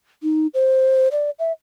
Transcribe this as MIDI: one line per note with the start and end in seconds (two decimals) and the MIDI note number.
0.23 0.47 63
0.54 1.08 72
1.12 1.30 74
1.39 1.52 76